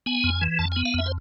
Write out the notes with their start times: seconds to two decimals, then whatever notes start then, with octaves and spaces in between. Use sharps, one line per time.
0.06 B3 G#5
0.24 F2
0.41 E3
0.59 F2 A5
0.72 G#5
0.76 B3
0.85 F5
0.94 F2 E5
1.06 C5